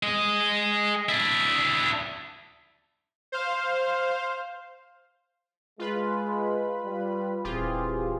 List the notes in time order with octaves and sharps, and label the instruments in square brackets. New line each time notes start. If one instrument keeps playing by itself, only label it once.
[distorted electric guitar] G#4 D#5
D4 E4
[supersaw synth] C5 F5
[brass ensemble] G#3 [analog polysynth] F4 B4 B5
[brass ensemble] G3
[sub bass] D#1 [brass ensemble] E3 C4 [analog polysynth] F4 G4 G#4